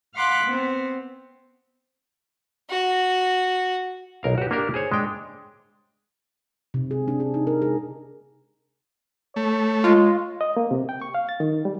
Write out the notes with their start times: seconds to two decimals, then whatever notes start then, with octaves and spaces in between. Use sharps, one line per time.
0.14 F5 F#5 B5 C6 D6 F#6
0.44 B3 C4
2.70 F#4
4.23 B1 A#4 F5
4.38 F#4 G4
4.51 A#3 D4 G4 A#4
4.74 G#4 C5 C#5
4.92 G#3 D4 G5
6.74 C3
6.91 G#4
7.08 D4
7.20 G#4
7.34 D#4
7.47 A#4
7.62 G#4
9.36 A3 C#5
9.84 G#3 F4
10.41 D#5
10.57 A#3
10.71 C3
10.89 G5
11.02 C#6
11.15 F5
11.29 A6
11.40 D#3
11.65 G3